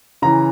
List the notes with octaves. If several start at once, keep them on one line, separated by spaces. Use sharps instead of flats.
C#3 E3 A#5